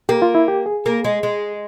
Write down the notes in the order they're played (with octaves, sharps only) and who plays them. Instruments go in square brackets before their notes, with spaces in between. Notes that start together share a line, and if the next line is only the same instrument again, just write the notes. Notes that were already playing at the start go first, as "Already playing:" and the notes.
[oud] A#3 [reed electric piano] G4
[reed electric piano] F4
E4
G4
G#4
[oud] A#3
G#3
G#3